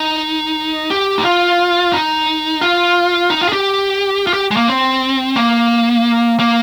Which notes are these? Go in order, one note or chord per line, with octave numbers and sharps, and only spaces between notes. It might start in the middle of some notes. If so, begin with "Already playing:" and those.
Already playing: D#4
G4
D#4
F4
D#4
F4
D#4
F4
G#4
G4
F4
G4
G#3
A#3
C4
A#3
A#3